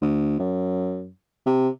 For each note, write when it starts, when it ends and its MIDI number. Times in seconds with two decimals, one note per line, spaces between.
0.02 0.39 38
0.39 1.09 42
1.46 1.69 48